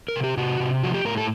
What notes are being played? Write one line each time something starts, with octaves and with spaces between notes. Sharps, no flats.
A#4
C3
G4
C3 F#4
C3
F3 F#4
G4
A2 A#4
A4